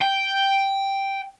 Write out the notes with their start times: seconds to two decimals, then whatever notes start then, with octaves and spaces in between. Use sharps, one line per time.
0.02 G5